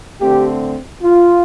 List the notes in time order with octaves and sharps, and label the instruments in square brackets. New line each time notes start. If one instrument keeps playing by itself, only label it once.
[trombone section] D3 A3 C4 G4
F4